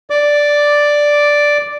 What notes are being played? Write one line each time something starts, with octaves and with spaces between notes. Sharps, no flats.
D5 D6